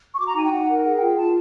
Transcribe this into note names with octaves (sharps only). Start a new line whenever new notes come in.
C#6
F#4 D6
A#5
D#4 G#5
G5
D#4 F#5
A#4
G#4 F#5
G5
F4
G5
F4 A5